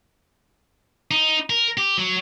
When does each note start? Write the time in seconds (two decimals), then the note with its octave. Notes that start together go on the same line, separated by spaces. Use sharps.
1.11 D#4
1.50 A#4
1.77 G4
1.98 F#3